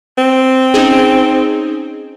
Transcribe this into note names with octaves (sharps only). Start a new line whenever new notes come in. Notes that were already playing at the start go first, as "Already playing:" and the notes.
C4
C#4 D#4 G#4